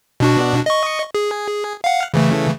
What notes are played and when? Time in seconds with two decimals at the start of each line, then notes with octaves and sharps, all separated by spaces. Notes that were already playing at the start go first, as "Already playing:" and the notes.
0.20 B2 D4 F#4
0.66 D#5 C#6
1.15 G#4
1.84 F5 F#5
2.14 C#3 E3 A3